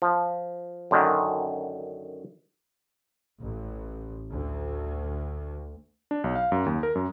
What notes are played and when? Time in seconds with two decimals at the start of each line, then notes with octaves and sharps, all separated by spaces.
0.02 F3
0.91 F#2 D3 D#3
3.41 A1
4.31 D2
6.11 D4
6.24 B1
6.36 F5
6.52 F#2
6.66 D#2
6.83 A#4
6.95 F#2